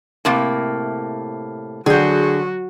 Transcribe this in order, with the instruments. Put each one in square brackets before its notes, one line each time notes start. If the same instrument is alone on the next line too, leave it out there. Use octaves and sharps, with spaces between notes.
[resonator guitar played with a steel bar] A2 C3 A#3
[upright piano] D3 [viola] F#3 F#4 [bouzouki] G#4 G5